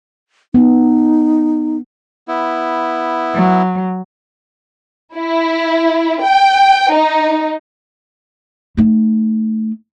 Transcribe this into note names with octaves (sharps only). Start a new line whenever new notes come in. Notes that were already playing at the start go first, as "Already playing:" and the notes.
B3 D#4
B3 E4
F#3
E4
G5
D#4
A3 D#4